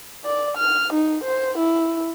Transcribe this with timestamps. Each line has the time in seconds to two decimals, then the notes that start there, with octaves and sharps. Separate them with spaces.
0.25 D5
0.58 F6
0.93 D#4
1.24 C5
1.58 E4